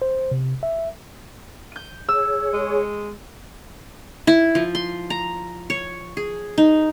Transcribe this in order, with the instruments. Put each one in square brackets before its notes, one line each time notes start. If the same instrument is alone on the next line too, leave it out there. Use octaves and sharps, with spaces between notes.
[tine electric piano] C5
C3
E5
[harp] G6 D#7
[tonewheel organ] G#4 C#5 [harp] E6
[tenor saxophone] G#3
[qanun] E4
F3
C6
A#5
C#5
G#4
D#4